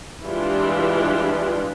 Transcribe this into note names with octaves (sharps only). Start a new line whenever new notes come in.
E3 G3 G#3 D4 F4